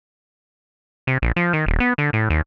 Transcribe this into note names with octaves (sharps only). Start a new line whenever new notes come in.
C3
A#1
F3
D#3
D#1
B3
D3
A2
D#2